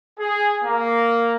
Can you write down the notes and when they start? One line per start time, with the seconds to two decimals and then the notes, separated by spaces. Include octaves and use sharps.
0.19 G#4
0.65 A#3